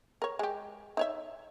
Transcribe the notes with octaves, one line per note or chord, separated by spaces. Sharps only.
A#4 C#5
G#3 G4
D#4 C#5 E5